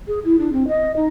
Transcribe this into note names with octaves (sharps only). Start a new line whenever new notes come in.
G#4
E4
D4
C4
D#5
D#4